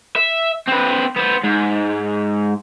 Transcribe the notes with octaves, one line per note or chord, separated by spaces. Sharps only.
E5
C4 B4
B3 C5
G#2